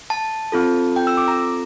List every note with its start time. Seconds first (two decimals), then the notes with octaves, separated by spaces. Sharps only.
0.10 A5
0.52 C4 F4 A4
0.96 G5
1.07 E6
1.17 D6
1.28 A#5